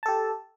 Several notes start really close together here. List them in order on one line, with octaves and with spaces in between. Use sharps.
A5 A4 G4